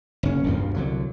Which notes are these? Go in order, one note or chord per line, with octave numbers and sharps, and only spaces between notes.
F#1 C#4
E1 D2 G2 F3
C2 D3 F#3